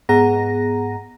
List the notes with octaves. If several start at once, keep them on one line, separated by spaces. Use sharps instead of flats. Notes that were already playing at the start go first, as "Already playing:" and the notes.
G#2 B3 G#4 F#5 A#5 A#6